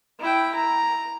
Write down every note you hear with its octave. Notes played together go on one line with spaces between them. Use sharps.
E4 G5
A#5